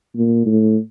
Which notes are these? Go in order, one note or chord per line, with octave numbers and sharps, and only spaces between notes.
A#2
A2